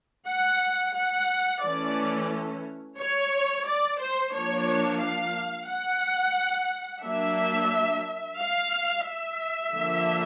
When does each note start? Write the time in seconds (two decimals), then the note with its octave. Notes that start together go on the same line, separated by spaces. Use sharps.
0.28 F#5
0.95 F#5
1.63 E3 A3 C#4 D5
2.98 C#5
3.66 D5
3.99 C5
4.33 F3 A#3 D4 C#5
5.00 F5
5.68 F#5
7.03 F#3 A#3 D4 E5
8.38 F5
9.05 E5
9.73 D3 F3 A#3